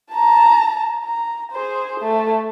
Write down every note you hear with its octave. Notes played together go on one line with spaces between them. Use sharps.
A5 A#5
A#5
G#4 C5
A3